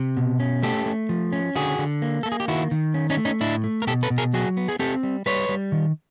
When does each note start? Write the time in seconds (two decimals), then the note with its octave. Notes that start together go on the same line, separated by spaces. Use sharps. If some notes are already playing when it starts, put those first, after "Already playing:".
Already playing: C3
0.17 B2
0.40 C#4
0.63 A3 G4 A4
0.86 A3
1.09 F3
1.32 C#4
1.55 D3 F#4 G#4
1.79 D3
2.02 A#3
2.23 A#3 A4
2.32 G#4
2.40 G4
2.48 D#3 E4 F#4
2.71 D#3
2.94 C#4
3.10 C#4 D#4
3.17 A3
3.25 C#4 D#4
3.40 A2 D4 E4
3.64 A3
3.82 A#4
3.87 B2 G4 A4
4.03 A4 B4
4.10 B2
4.18 G#4 A#4
4.34 F#3 F#4 G#4
4.57 B3
4.68 G#4
4.79 C4 G4 A4
5.03 G3
5.26 G3 B4 C#5
5.49 G3
5.72 D#3